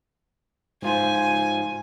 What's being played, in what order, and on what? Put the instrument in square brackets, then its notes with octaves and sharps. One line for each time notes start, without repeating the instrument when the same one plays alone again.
[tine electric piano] G#2 F4 C5 [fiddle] G#5